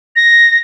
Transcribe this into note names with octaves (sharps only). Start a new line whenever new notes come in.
A#6